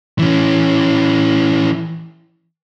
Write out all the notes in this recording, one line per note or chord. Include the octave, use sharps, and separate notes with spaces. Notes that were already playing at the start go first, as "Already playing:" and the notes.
E3 C#4